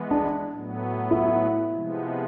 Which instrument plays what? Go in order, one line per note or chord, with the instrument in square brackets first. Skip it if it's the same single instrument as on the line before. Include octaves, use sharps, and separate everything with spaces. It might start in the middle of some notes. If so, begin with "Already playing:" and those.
Already playing: [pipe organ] E3 G#3 B3
[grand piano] D4
[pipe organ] A2 F#3 B3
[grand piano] E4
[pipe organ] C3 F3 G#3 B3